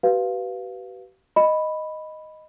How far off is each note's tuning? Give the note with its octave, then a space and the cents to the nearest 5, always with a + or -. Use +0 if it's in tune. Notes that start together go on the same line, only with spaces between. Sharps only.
G4 -45 B4 +0 F5 +0
D#5 +0 B5 +0